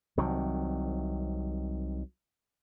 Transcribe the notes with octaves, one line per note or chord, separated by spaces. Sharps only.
C2 C3 D#3 F#3